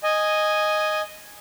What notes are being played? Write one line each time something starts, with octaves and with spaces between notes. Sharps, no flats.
D#5 G#5